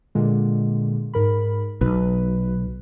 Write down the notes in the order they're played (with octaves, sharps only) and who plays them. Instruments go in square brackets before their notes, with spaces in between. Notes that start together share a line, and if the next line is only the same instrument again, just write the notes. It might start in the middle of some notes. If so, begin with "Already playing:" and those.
[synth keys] A#2 D3 G#3
G#2 A#4 B5
[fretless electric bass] B1 [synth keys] B4